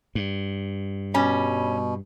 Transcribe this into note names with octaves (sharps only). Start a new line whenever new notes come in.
G2
B2 G3 C#4